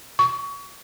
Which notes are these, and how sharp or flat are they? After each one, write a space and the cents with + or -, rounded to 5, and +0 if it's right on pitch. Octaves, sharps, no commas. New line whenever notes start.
C#6 +30